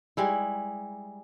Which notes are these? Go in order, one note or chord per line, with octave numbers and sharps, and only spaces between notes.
G3 G#3 E4